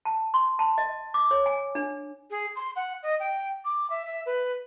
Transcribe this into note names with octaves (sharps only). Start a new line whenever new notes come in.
A5
C6
A5
D#5
D6
C#5
G#5
D4
G#4
C6
F#5
D#5
G5
D6
E5
E5
B4